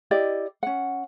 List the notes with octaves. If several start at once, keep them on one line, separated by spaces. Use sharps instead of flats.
E4 G4 D5 D#5
C#4 F#5